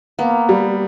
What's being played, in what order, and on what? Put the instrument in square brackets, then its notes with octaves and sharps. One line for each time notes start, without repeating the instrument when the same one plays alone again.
[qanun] A#3 [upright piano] B3
[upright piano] G3